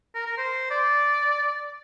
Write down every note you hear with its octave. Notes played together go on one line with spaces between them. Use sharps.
A#4
A#4
C5
D5